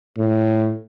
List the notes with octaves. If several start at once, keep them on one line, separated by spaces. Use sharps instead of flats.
A2